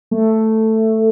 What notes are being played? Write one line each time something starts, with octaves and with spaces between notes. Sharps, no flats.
A3